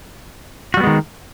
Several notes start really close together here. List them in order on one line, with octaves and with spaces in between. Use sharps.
F#4 G3 B3 G#3 D#3